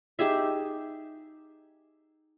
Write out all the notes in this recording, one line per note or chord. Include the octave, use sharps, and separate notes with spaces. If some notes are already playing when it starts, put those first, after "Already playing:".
D#4 G4 G#4 E5